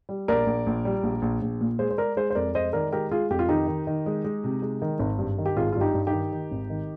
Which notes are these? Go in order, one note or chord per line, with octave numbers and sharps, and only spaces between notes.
G3
A#1 A#4 D5
A#1
A#1
G3
A#1
A#1
A#1
A#2
G#3 G#4 C5
C5
G#3 A#4 D5
G#3 G#4 C5
C5
F2 A#4 D5
G#3 C5 D#5
D#3 A#4 D5
G#3 G4 A#4
G#3 F4 G#4
F2 G4
F4
D#3 D#4 G4
D#3
D#3
G#3
G#3
C3
G#3
D#3
G#1
G2
D#3
G4
G#1 F4 G#4
G2 F4
D#4 G4
G2
D#4 G4
D#3
D#3
G#1
D#3